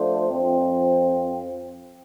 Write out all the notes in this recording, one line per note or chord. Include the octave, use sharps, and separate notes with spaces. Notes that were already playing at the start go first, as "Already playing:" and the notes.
Already playing: F3 A3 D4 A4 C5
F2 F3 C4